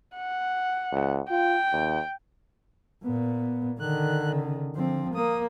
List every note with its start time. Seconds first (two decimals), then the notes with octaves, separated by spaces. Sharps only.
0.17 F#5
0.92 C#2
1.31 F4 G5
1.72 D#2
3.04 A#2 B3
3.80 D3 D#3 F#6
4.33 C#3
4.76 D3 F3 C4
5.15 A#3 D#6